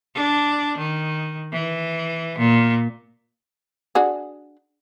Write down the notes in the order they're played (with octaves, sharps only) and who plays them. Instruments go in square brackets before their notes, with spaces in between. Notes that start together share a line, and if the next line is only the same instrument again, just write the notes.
[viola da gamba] D4
D#3
E3
A#2
[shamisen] D4 F#4 G#4